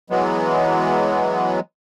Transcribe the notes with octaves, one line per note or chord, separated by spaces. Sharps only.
E3 F#3 G#3 B3